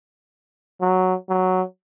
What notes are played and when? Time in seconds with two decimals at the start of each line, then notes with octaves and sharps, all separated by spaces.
0.81 F#3
1.29 F#3